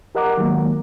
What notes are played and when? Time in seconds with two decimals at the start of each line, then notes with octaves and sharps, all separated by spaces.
0.15 G4 A#4 D#5 F#5 A#5 D6
0.37 D#3 F#3 G#3 A#3